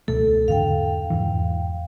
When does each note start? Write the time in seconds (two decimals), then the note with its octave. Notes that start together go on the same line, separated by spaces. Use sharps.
0.08 C#2 B2 A3 A4
0.48 E2 G#2 D3 F5 G5
1.10 E2 G#2 E3